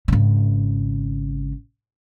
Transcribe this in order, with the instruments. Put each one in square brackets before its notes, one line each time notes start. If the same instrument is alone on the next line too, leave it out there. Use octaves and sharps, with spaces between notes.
[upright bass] G#1 C#3